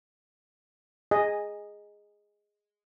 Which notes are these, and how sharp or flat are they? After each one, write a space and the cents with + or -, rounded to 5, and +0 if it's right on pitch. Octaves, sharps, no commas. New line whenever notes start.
G#4 -5 D#5 +0 G#5 -15